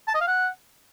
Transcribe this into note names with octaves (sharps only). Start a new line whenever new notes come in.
A5
D#5
F5
F#5